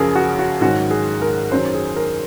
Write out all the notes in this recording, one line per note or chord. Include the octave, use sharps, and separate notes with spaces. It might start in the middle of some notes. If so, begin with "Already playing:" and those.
Already playing: F#2 C#3 F3 G#4 A#4
F#4
F#4
G#2 D#3 F#3 F#4
G#4
A#4
F#2 D#3 F#3 C5
G#4
A#4